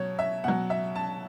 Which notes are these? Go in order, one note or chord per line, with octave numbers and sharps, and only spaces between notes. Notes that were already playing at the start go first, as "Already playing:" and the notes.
Already playing: B2 F#3 C#5
E5
B2 F#3 F#5
E5
A5